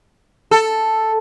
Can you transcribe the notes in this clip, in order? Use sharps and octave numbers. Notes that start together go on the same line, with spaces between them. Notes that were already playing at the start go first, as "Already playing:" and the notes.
A4